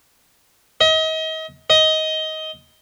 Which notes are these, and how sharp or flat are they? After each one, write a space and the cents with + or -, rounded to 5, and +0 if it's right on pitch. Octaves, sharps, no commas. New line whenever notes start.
D#5 +35
D#5 +15